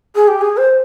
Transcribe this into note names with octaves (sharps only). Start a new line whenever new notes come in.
G#4
G4
G#4
C5